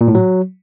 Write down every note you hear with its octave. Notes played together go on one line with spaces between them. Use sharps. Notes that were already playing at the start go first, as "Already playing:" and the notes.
A#2
A2
F#3